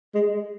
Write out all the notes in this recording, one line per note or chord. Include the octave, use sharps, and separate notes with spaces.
G#3